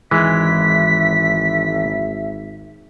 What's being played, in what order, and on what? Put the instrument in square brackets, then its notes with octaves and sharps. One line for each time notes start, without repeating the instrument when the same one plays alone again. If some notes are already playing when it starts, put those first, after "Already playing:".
[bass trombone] G#1 [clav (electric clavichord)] E3 G#3 [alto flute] E5 [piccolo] B6